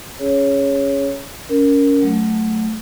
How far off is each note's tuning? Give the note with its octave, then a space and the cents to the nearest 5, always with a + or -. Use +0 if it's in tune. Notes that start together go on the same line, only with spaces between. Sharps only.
C#4 +0 G#4 +0 C#5 +0
C#4 +20 A#4 +0
F#3 +0 A3 +0